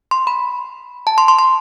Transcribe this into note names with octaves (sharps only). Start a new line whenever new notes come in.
C6
B5
A5
C6
C6
C6